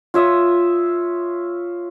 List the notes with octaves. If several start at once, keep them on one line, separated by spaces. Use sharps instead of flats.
F4 C#5 E5 D#6